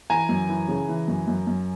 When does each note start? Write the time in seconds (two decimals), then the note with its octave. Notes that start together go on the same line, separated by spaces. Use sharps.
0.10 E3 G#5 A#5
0.29 F#2
0.49 E3
0.68 C#3
0.89 E3
1.08 F#2
1.28 F#2
1.47 F#2